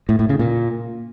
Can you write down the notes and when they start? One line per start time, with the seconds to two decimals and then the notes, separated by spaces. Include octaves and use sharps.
0.09 A2
0.19 A2
0.29 C#3
0.39 A#2